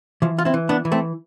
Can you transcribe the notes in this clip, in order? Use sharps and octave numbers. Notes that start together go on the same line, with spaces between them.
E3 F3
F4
C4 E4
E3
B3 D4
E3
A3 C4